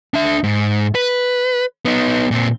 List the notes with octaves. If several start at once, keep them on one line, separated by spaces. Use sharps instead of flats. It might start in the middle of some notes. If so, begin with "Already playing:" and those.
D4 E5
G#2
B4
B3 D#4
A#2 C4